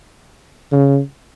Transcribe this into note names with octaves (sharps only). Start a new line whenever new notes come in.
C#3